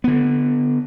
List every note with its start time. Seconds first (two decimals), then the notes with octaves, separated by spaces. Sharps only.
0.04 D3 B3